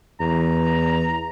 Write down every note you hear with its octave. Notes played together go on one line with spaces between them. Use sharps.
E2 A#5